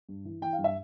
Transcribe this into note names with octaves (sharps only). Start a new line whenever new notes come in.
G2
E3
E3 G5
F5
G2
E5